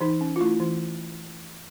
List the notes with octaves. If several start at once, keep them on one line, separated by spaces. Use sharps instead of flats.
E3 D#4
C#4
F4
A3 E4
E3